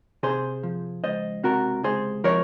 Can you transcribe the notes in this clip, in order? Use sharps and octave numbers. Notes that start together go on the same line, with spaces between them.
C3 G#4 C5
F3
C#2 C5 D#5
C3 F#4 A#4
C#2 G#4 C5
F3 A#4 C#5